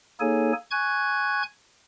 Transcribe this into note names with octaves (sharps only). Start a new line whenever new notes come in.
A#3 D#4 G#4 A4 C#5 G#5
G#5 C#6 F#6 G#6